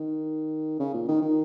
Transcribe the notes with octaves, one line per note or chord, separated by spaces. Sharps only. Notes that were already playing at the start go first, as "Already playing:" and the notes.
Already playing: D#3
C#3
A#2
D#3
D#3